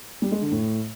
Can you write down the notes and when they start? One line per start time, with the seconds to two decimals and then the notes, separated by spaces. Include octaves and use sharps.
0.22 G3
0.32 G#3
0.42 D3
0.51 A2